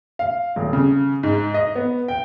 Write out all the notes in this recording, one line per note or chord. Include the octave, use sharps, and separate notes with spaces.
F5
D#1
C#3
G#2
D#5
B3
G5